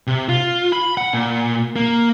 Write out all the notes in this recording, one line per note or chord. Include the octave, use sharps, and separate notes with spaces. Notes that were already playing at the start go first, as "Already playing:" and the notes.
C3
F4
B5
F#5
A#2
A#3